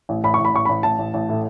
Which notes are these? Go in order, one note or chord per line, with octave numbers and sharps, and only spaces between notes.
A1
A1 B5
A1 C#6
B5
A1 C#6
A1 B5
A1 A5
A1
A1
A2